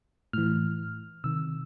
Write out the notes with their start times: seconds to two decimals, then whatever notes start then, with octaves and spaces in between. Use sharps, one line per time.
0.33 A2 E3 F6
1.24 C3 D#3 E6